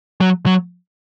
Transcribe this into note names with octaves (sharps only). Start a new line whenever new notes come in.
F#3
F#3